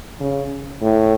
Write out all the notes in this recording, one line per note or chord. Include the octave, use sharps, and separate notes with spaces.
C#3
A2